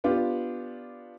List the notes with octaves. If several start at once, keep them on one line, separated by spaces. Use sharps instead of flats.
B3 D4 F4 G4